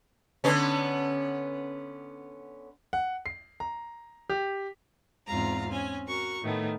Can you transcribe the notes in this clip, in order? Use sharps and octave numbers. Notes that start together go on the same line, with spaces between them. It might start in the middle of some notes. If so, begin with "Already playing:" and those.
D3 B3 C#4
F#5
C7
A#5
G4
E2 G#2 C4 F4 F5 A#5
C4 C#4 G#5
F#4 A#4 C#6
A2 D#3 A3 B3